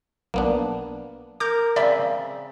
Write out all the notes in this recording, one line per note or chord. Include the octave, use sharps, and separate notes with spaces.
B1 A#3 B3 D4
A#4 D6 G6
C#3 C4 D5 E5 B5